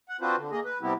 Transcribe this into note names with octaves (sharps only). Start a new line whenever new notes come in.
F#5
C4 D4 F4 F#4 B4 C5
D3
A#3 G#4 D#5
B4
C3 G3 B3 C4 E4 G4